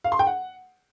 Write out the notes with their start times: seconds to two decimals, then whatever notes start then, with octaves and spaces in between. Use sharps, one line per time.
0.04 F5
0.12 C6
0.19 G5
0.27 F#5